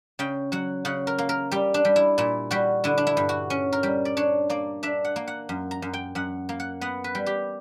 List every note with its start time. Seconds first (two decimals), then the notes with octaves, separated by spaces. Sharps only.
0.19 C#3 G5
0.52 F#3 F#5
0.85 C#3 F#5
1.07 A#4
1.18 A#3
1.29 A#4
1.51 G3 G4
1.74 D4
1.85 G3
1.96 E4
2.18 A#2 E4
2.51 G3 F#4
2.84 D3 E4
2.98 D4
3.07 E4
3.17 G2
3.29 F#4
3.50 C#4
3.73 A#4
3.83 G3
4.05 D5
4.17 D4 C#5
4.50 A#3 D5
4.83 D4 E5
5.05 F#5
5.16 A#3
5.27 F#5
5.49 F#2
5.71 A#5
5.82 F#2
5.93 G5
6.15 F#2 F#5
6.49 A#3
6.60 F#5
6.81 B3 F#5
7.04 B4
7.15 G3
7.26 G4